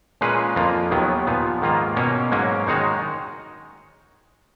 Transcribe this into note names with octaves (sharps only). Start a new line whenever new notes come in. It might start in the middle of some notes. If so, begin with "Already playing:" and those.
A#2 G#3 C#4 G#4 B4
F2 F3 A#3 F4
D#2 D#3 F#3 B3
A#2 F3 B3
G#2 D#3 A#3 F4
B2 A#3 C#4
G#2 F#3 A#3 C#4
D#3 G#3 D#4 F#4 C#5